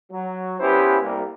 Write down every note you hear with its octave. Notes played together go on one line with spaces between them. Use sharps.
F#3
B3 C#4 E4 G4 B4 C5
C2 A#3